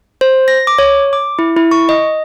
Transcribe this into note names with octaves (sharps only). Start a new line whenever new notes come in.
C5
A#6
D6
C#5
D6
E4
E4
C#6
D#5